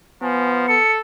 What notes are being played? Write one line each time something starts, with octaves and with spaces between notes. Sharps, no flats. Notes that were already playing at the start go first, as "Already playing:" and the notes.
F3 B3 G#5
A4 C#7